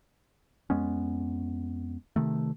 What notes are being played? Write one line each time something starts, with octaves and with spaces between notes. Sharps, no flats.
F2 G#3 B3 C#4
C3 D#3 A3